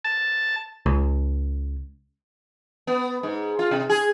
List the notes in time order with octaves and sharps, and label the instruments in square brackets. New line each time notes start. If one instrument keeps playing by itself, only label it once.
[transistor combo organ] A5
[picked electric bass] C#2
[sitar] B3
G#2
F4
C3
G#4